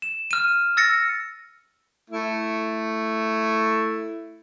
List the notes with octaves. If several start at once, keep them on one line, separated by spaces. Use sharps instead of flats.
E7
F6 D#7
E6 A6 A#6 C#7
A3 E4